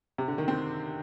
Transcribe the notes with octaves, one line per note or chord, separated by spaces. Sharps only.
C3
D3
D#3
C4